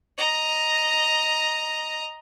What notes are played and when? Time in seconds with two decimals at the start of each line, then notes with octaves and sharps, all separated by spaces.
0.18 D#5 A#5